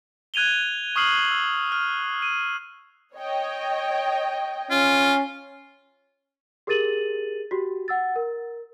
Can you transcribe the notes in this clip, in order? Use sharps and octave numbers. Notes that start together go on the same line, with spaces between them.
F#6 G#6 D#7 F7 G7
C#6 D#6 F6 C7 F#7
E6
F6
D#7
C#5 D#5 G5
C#4 F4
G4 G#4 A#4 A6 D#7 F#7
F#4 G4
F#5 E6 A6
A#4